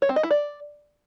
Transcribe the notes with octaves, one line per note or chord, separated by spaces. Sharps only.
C#5
C4
D#5
E4
D5